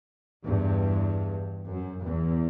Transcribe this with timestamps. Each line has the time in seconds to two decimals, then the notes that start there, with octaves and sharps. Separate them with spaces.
0.44 E2 G2
1.70 F#2
2.02 E2